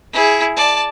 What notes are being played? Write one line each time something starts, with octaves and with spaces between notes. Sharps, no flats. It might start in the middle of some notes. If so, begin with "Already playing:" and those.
E4 G#4
D5 A5